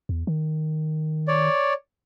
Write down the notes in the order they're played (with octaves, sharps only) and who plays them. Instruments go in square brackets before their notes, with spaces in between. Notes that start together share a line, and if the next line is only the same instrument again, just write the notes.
[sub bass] E2
D#3
[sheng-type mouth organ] C#5 D5